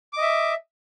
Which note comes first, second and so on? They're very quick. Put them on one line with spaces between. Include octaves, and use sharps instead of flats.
D6 D#5 E5